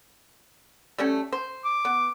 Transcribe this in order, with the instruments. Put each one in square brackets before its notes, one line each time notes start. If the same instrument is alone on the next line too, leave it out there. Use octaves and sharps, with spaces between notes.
[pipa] G3 A3 C#4
C5
[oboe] D6
[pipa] B3